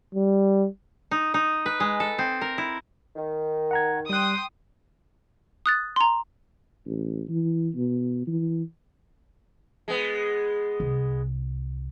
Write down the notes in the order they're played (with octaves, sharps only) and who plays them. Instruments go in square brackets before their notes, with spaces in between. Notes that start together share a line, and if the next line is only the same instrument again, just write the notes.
[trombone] G3
[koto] D#4
D#4
B4
G#3
A4
C4
A#4
E4
[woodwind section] D#3
[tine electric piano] F#5 A#5 G#6
[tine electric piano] G3 F#6 [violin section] G5 C6 D#6
[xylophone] D#6 F#6 A6
A#5 C6
[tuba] A1
E3
B2
E3
[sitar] G#3 B3
[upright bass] C2